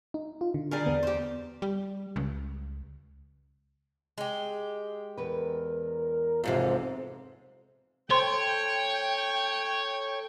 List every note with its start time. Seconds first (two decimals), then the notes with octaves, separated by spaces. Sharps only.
0.14 D#4
0.41 F4
0.54 D3
0.71 G3 G#4 A#4
0.86 E2 B3
1.03 G4 C5
1.62 G3
2.16 C#2
4.18 G#3 G4
5.17 E2 A#4 B4
6.44 B1 F2 G#2 C3
8.10 A4 C5 C#5 G5 C6